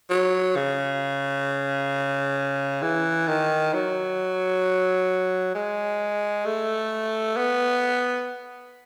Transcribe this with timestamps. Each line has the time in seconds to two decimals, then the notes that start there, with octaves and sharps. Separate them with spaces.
0.10 F#3
0.56 C#3
2.82 E3
3.28 D#3
3.73 F#3
5.55 G#3
6.45 A3
7.36 B3